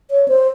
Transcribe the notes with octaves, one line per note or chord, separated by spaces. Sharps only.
C#5
C5